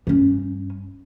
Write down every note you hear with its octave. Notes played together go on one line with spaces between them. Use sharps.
G2 C#4